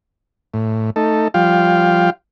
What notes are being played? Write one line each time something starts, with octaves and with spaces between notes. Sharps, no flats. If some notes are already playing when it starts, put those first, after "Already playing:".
A2
A3 D#4 A4
F3 G3 F4 F5 G5